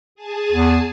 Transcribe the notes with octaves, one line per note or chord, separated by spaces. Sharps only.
G#4 G#5 A5
E2